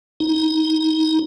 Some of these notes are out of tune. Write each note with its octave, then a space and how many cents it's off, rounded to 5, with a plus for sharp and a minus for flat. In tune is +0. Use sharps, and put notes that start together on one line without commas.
D#4 +20